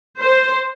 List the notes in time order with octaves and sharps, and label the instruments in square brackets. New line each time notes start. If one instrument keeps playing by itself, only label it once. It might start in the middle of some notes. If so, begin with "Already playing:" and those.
[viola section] C5